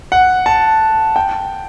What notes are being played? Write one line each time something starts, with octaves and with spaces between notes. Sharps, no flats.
F#5
A5
G5